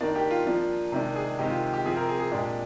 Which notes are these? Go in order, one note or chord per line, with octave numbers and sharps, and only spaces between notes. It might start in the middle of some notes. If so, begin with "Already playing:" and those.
D#3 A#3 D4 D5
G4
F4
F3 A#3 D4
C3 D#3 G#3 D4
G#4
C3 D#3 G#3 C4 G4
F4
G4
C3 F3 C4 G#4
A#4
G#4
G#4
A#2 G#3 D4 G4